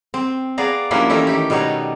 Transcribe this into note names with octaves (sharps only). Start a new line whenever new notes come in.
C4
B3 G#4 D5 F5 A#5
F3 G3 A#3 C#4 D4 E4
E3 A3 C#4 D#4 E4
D#3 E4 G4
B2 G3 B3 D#4 C#5